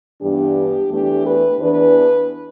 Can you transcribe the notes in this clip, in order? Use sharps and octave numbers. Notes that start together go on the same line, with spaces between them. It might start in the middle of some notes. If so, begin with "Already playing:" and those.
G2 E3 B3 D4 G4
E2 E3 A3 D4 G4
B4
E2 E3 B3 D4 B4